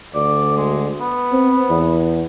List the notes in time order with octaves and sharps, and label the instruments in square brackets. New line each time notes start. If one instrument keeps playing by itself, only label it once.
[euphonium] D2 [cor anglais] D5
[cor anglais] G#3
B3
[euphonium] C4
E2